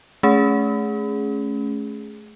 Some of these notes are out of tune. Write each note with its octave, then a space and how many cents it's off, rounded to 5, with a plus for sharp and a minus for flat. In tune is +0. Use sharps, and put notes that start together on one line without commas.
A3 -30 C#4 +0 G#4 +0